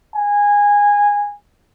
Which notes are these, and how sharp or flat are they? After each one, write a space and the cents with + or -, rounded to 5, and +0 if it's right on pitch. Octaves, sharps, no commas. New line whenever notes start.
G#5 -15